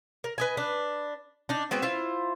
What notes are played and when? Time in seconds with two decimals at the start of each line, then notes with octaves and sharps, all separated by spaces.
0.24 A#4
0.38 B4 D#5 G#5
0.57 D4 B4
1.49 D4 D#4
1.71 G#3 B3 C4 F#4
1.82 E4 F4 C5